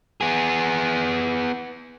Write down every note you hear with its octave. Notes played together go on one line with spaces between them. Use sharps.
B3 G#4